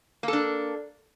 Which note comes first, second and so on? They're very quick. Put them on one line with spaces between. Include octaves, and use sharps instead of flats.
A#3 A4 D4